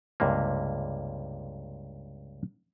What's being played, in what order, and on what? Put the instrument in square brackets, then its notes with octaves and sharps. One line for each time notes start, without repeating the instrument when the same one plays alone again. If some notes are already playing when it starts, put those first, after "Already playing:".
[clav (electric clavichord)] C#2 G2 C3 A#3